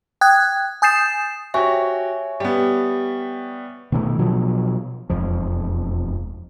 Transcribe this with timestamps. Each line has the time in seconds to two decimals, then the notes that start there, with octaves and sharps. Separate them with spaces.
0.21 G5 D#6 F#6 G#6
0.82 G#5 D#6 G6 A6 C7 E7
1.54 F#4 G4 C#5 E5 G#5
2.40 G3 B3 G4
3.92 B2 D#3 E3 A3
4.19 B2 F3 F#3
5.10 E1 F2 F3